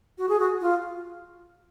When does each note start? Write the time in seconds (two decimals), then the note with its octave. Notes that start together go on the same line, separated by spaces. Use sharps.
0.18 F#4
0.29 G#4
0.39 F#4
0.61 F4